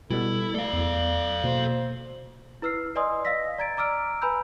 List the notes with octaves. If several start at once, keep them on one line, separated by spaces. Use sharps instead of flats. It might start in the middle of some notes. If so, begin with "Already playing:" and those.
B2 G3 E4 A4
A3 A4 D5 F5
E2
B2 A#3 C5
E4 B4 E6 F6 C7
B4 D5 D#5 G#5 C6 D#6
D#5 F5 E6 A#6 B6
D5 A#5 G#6 A6 D7
A#5 D6 E6 F6 D7
B4 G#5 A#5 B5 E6 G6